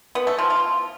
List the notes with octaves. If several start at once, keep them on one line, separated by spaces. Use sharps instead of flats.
B3
A3
F3
F4